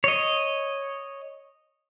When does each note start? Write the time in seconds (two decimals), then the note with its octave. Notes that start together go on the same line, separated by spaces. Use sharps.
0.04 C#5 D#5